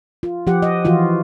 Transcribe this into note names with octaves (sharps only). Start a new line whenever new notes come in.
F4
F3 G4 F#5
D#5
E3 F3 F4 F#4